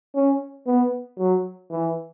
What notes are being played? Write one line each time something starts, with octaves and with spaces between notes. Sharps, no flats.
C#4
B3
F#3
E3